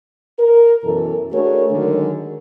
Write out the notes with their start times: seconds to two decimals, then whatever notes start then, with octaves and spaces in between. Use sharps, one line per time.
0.39 A#4
0.84 F#2 B2 E3 F#3 A4
1.33 A3 D4 F#4 G#4 A#4 C#5
1.71 D3 D#3 F#3 G#3 G#4 A#4